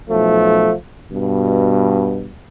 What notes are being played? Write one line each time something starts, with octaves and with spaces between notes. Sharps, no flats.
B1 F3 A3
G2 B2